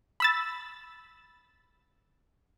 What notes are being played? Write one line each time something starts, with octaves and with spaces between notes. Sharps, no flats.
B5 E6 A6